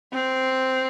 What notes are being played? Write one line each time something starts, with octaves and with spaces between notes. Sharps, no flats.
C4